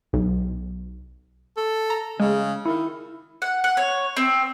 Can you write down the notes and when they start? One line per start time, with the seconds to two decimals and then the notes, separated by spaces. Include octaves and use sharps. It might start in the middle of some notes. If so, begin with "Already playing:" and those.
0.13 B1
1.57 A4
1.90 A#5
2.20 C#3 G#3
2.66 D#3 E4
3.42 F#5
3.64 F#5
3.77 C#5
4.17 C4